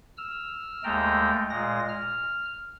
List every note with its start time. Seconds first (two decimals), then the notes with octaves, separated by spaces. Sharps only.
0.17 E6 F6
0.84 D#2 G#3 A3 G5 A#5
1.50 A#2 G#3 A#6
1.89 F6